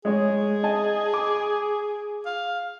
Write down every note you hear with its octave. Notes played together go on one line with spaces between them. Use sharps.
G#3 G#4 C#5
D#5 G#5 A5
D6
F5